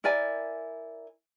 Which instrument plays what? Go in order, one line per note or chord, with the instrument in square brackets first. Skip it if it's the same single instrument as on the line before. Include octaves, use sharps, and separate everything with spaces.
[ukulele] E4 A#4 D5 G#5